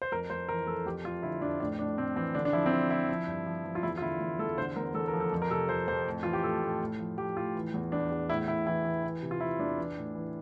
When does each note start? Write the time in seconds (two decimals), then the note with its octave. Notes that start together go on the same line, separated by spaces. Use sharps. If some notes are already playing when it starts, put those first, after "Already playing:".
0.02 C5
0.12 F2 A#4
0.30 F2 C5
0.49 E3 A#4
0.67 F2 A4
0.86 F2 G4
1.05 F2 F4
1.23 D3 E4
1.41 F2 D4
1.60 A2 D4
1.79 A2 D4
1.97 A2 C4
2.16 E3 C4
2.35 D3 D4
2.45 D4
2.53 F3 E4
2.66 C4
2.72 F3 D4
2.90 F3 E4
3.09 F3
3.27 G2
3.46 F3
3.65 F3
3.75 F4
3.83 E2 E4
3.98 F4
4.01 D3 E4
4.20 E2
4.39 E2 A4
4.58 D3 C5
4.76 E2 A#4
4.94 E2 A4
5.08 A#4
5.13 F3
5.20 A4
5.32 F2
5.42 A#4
5.50 C3 A4
5.69 F2 C5
5.88 F2 C5
6.06 A2
6.23 E3 F4
6.33 G4
6.43 A2 A4
6.62 A2
6.80 A2
6.99 F3
7.18 F3 G4
7.37 A2 F4
7.55 E3
7.74 E2
7.92 E2 D4
8.11 E2
8.29 A2 E4
8.48 A2 E4
8.67 E3 E4
8.85 E3
9.03 E3
9.23 C3
9.31 F4
9.41 E3 E4
9.59 E2 D4
9.78 E3
9.97 A2
10.15 E3